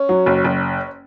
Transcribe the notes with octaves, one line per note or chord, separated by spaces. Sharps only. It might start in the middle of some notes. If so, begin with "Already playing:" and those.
Already playing: C#4
F#3
F#1
F#1